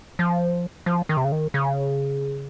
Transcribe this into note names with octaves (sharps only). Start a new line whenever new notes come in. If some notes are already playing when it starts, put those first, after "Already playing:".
F3
F3
D#3
C3
C#3
D#3
C#3